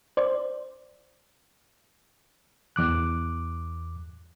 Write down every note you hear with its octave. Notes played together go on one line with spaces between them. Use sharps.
C5 D5
E2 D6 F#6